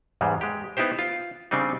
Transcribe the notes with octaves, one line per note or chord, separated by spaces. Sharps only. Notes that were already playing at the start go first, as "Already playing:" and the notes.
E2 G#2 G3 G#3
G#3 G4
B3 D#4 E4 G4 C5
F4
C#3 G3 C4 D4 D#4